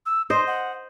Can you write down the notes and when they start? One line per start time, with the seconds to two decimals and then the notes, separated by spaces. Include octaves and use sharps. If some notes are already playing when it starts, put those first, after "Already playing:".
0.06 E6
0.30 C5 D#5 C6
0.47 F#5